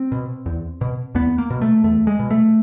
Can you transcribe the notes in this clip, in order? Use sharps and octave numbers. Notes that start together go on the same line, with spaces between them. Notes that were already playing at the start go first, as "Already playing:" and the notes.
Already playing: C4
B2
E2
B2
E2 B3
A#3
B2
A3
E2 A3
G#3
B2
A3